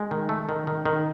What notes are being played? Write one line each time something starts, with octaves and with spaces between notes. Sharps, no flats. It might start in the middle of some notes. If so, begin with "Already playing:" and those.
Already playing: G#3
D#3
A3
D#3
D#3
D#3